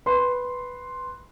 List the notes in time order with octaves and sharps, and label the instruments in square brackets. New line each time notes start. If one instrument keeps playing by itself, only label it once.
[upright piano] B4 C6